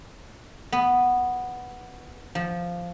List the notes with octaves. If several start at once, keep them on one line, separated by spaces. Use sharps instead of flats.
B3
F3